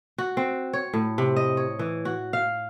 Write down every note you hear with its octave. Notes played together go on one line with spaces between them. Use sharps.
F#4
C4
C#5
A2
C3
D#5
C#5
E3
F#4
F5